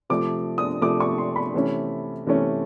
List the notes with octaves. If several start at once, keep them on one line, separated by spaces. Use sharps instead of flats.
C3 F3 A3 D6
D#6
C3 F3 A3 D6
C#6
C6
B5
C3 E3 A3 C#4
C3 E3 A3 C#4